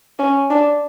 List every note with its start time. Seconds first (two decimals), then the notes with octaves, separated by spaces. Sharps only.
0.19 C#4
0.50 D4